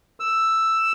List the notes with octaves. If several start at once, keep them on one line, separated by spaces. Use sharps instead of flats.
E6